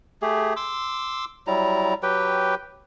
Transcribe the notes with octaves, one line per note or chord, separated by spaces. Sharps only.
A3 G4 G#4
C6 D6 E6
F#3 G3 E4 A#5
F#3 G4 B4 G5